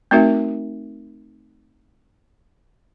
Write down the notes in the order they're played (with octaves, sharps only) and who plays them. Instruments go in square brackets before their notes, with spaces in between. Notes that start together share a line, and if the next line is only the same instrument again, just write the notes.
[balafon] A3 C4 D#4 F#4 A#4 E5